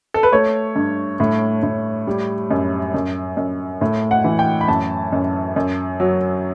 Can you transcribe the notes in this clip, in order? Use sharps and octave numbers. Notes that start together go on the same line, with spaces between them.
A4
B4
A3 C#5
G2
A2
A2
G3
F#2
F#2
F#2
A2
F#5
E3
G5
B5
F#2 A5
F#2
F#2
F#3